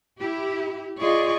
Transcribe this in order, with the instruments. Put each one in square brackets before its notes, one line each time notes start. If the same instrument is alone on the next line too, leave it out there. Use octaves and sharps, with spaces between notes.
[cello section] E4 G4
[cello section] F4 G#4 D5 [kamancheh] D#5 C#6